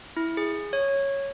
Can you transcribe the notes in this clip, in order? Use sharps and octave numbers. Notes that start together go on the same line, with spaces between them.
E4
G#4
C#5